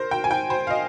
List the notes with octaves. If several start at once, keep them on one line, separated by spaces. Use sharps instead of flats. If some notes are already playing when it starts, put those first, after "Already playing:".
Already playing: A#4 C5
G5
G#5
G5
C5
F5
D#5